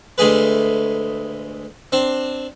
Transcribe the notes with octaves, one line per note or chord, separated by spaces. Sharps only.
D2 G#3 A3 G#4 B4
C4 D4